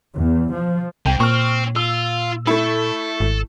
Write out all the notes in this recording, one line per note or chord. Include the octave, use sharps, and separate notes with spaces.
E2
F3
C2 G#2 G#3 G5
A#2 C4 C#6 F6
F4 E6
A3 E4 A4
G#1